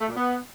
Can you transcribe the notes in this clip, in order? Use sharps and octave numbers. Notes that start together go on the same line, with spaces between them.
A3
A#2
B3